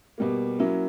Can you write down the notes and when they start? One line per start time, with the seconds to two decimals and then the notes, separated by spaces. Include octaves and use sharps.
0.18 B2 G3 A#3
0.59 F#3 A#3 C#4 E4